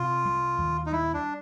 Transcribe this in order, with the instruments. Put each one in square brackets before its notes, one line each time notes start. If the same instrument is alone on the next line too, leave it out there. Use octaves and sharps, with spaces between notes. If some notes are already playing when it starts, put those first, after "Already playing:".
Already playing: [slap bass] C3 [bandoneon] F4
[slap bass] G3
D#2
[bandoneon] D#4
[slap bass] G3 [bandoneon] E4
[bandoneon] D4